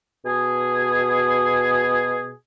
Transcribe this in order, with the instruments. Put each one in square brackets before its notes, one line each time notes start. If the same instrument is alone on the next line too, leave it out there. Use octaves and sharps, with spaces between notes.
[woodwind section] B2 G#4